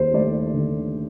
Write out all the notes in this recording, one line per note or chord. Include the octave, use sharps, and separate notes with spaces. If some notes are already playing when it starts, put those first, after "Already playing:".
Already playing: D#2 C5
A3 D5
D3